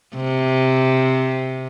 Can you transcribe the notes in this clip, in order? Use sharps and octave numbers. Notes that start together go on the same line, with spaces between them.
C3